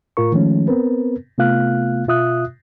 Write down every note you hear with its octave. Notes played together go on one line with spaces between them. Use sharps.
A2 F4 A#4 C#6
D#3 F3 G#3 A3 C#4
B3 C4 A#4 B4
C3 A3 B3 F4 F5 F#6
B2 F4 E5 D#6 F#6